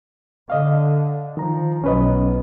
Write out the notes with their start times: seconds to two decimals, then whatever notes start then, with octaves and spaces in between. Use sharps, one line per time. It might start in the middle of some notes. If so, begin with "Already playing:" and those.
0.50 D3 D#5 F5
1.37 D#3 F3 A#5
1.84 B1 C#4 B4 D#5